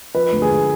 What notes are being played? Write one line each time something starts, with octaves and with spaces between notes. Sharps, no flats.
F3 B4
D2
G#4
D2